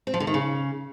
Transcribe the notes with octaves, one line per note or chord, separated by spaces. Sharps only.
C4
F3
D3
D#3
C#3